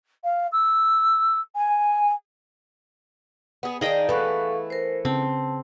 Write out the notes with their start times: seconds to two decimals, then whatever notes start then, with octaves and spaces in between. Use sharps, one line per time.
0.24 F5
0.52 E6
1.55 G#5
3.63 B3 G#4
3.81 D#3 D4 D#4 G#4 D#5 F5 G5
4.09 E3 A3 A4 B4 F5 F#5 C#6
4.70 A#4 C5
5.05 C#3 C4 A5